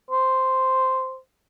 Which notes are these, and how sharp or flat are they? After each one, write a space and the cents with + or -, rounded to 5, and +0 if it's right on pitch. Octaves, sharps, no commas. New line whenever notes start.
C5 -5